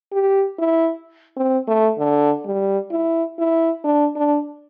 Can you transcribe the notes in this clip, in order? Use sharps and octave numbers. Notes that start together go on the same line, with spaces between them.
G4
E4
C4
A3
D3
G3
E4
E4
D4
D4